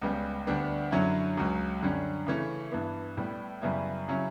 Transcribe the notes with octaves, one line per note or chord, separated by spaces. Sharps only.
C#2 C#3 G3 B3
D2 D3 G3 B3 D4
F#2 D3 F#3 C#4 E4
C#2 C#3 F#3
F#2 D3 G3 C#4
C#3 E3 A3 C#4 E4
G2 E3 B3
A2 G3 B3
F#2 C#3 G3 B3 E4
C#3 F#3 C#4 E4